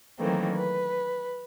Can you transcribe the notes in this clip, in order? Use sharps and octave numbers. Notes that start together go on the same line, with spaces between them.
D#3 E3 F#3 A3 A#3 C4
B4